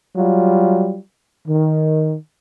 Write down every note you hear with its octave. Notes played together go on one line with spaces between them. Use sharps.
F#3 G3 F4
D#3